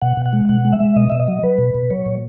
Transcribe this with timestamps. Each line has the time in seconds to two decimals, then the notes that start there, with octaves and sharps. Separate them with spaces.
0.02 B2 F#5
0.17 B2
0.26 F#5
0.33 G#3
0.49 B2 F#5
0.65 G#3
0.72 E5
0.80 G#3
0.96 B2 D#5
1.10 B2 E5
1.19 D#5
1.28 F#3
1.43 F#3 B4
1.58 B2
1.75 B2
1.90 F#3 C#5
2.06 A#2